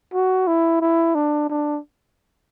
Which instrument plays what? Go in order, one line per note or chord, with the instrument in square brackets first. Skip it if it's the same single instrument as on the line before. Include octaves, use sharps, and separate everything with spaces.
[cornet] F#4
E4
E4
D4
D4